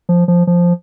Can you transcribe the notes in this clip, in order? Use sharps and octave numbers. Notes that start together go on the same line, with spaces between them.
F3
F3
F3